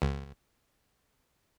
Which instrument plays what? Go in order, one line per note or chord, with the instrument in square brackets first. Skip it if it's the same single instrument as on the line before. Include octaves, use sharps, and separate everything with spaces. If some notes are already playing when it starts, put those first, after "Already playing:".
[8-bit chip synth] C#2